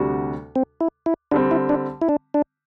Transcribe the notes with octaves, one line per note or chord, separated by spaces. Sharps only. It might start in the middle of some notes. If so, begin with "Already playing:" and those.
Already playing: D2 C3 G3 D4 F#4
C4
E4
E4
D3 G3 C4 D4
E4
D4
E4
D4
D4